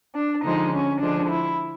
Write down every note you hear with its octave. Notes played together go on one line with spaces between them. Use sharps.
D4
D3 F3 G#3 D#4
C#4
D3 F3 G#3 D4
E4